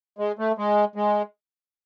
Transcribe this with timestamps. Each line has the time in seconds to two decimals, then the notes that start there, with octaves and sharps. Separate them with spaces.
0.19 G#3
0.39 A3
0.58 G#3
0.96 G#3